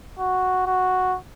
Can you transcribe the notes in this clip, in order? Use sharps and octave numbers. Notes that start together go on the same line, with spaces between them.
F#4
F#4